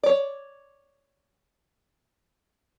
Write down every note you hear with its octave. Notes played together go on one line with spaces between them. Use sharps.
C#5 D5